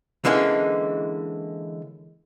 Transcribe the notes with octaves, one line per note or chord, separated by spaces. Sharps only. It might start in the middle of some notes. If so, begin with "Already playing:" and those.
D3 E3 G#3 A#3 C#4